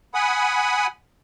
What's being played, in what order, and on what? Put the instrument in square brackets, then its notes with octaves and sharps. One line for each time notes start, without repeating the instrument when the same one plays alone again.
[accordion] F#5 G#5 B5 D#6